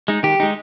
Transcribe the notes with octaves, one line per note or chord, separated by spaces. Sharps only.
G#3 D#4
D#3 G4
G#3 D#4